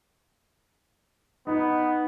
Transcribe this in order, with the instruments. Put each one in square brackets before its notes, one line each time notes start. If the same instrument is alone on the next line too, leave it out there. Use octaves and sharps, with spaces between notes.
[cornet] B3 [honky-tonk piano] D#4